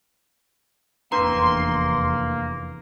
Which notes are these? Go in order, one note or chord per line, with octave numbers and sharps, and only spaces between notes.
F1 E2 A#3 D4 B4 A#5 C6